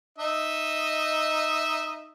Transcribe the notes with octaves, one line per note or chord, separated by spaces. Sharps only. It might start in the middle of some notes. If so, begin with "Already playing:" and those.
D#4 D#5 E5